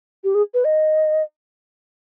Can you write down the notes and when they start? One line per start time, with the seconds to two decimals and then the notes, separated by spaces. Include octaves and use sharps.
0.24 G4
0.35 G#4
0.54 B4
0.65 D#5